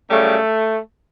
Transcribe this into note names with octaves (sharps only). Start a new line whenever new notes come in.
F#2 C#3 G3 A3